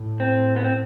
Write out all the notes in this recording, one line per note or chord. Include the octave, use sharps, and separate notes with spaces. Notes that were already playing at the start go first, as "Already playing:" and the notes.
Already playing: A2
C4
B3
C4